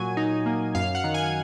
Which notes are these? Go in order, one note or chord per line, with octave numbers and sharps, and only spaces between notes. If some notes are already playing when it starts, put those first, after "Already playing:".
Already playing: A#2 F#3 G#5
D#4
A#3
F#2 F5
F#5
D#3
G#5